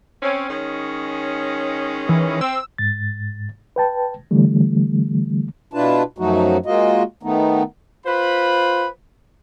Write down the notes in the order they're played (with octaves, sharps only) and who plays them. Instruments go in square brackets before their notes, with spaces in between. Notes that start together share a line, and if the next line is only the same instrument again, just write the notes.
[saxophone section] C4 C#4
D#3 G#3 C#4
[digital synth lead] E3
[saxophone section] C4 [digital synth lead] E6
[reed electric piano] G#2 A6
B4 G5 A5
D3 E3 G3 A3
[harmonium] B2 D4 E4 F4 B4 A5
F#2 F3 F#3 A3 D#4 F#4
G#3 A#3 F4 F#4 D#5
D#3 A3 B3 D#4
[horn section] F4 B4 C5 B5